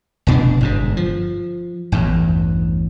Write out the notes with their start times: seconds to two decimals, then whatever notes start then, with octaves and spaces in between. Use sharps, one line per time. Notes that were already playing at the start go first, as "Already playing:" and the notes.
0.27 F1 B2 B3 D4
0.61 G1 G#2 B2
0.97 F3
1.92 A1 E2 G2